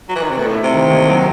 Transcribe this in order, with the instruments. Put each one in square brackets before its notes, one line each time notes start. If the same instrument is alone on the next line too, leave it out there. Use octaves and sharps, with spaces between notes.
[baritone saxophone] F#3
E3
D#3
C3
[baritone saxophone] B2 [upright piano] A3
[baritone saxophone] A2
[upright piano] E4
[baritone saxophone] C3
[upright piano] D#3
D#2
F#3